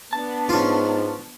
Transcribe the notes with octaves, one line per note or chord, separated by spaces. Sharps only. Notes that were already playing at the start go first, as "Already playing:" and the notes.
B3 D4 A5
G#2 C#4 F4